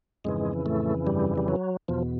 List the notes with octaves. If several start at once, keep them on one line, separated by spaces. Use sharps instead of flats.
F2 G#2 C#3 E3 G#3
A2 A3
G2 G3
G3
F#3
E2 B2 F3